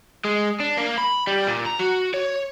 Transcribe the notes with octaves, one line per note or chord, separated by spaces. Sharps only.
G#3
D4
A#3
B5
G3
A#2
A#5
F#4
C#5